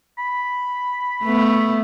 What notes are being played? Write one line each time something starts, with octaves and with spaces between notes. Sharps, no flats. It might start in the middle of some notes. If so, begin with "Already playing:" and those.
B5
A3 B3